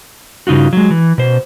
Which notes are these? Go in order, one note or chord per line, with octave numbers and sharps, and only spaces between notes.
G2 C#3 D#4 F4 F#4
F#3 G#3
E3
B2 C5